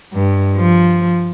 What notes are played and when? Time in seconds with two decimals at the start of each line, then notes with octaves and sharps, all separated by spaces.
0.13 G2
0.56 F3